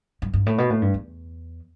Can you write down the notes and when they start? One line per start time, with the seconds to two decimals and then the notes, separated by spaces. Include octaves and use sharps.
0.22 G2
0.33 G2
0.46 A2
0.58 B2
0.70 A2
0.82 G2
0.94 E2